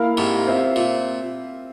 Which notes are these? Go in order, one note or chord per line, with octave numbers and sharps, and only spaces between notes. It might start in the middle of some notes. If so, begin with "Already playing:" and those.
Already playing: A#3 E4 A#4 F5
G#2 C3
C4 F4 C5 E5
A#2